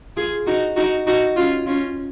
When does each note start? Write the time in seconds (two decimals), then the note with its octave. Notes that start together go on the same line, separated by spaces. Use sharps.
0.16 F4 G#4
0.46 D#4 F#4
0.76 D#4 F#4
1.07 D#4 F#4
1.36 C#4 F4
1.66 C#4 F4